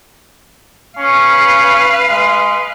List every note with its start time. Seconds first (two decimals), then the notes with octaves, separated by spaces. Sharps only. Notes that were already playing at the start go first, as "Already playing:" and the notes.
0.98 C#4 B4 F5
2.09 G#3